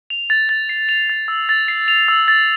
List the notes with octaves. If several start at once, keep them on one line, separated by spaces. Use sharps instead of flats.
F7
A6
A6
C7
F7
A6
E6
A6
C7
F7
E6
A6